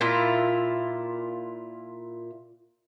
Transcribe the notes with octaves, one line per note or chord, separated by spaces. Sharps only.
A#2 E4 F4